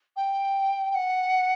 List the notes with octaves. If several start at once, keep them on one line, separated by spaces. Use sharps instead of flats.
G5
G5
F#5